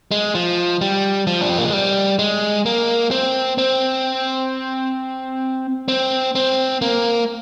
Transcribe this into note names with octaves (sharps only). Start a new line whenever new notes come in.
G#3
F3
G3
F3
D4
C4
A#3
G#3
G3
G#3
A#3
C4
C4
C4
C4
A#3